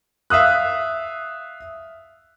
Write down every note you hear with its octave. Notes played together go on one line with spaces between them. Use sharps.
E5 F5 D#6 F#6